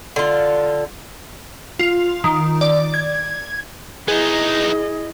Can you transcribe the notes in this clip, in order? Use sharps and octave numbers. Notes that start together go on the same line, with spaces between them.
D3 F4
F4
D#3
D5
G#6
B3 D#4 E4 G#4 D#5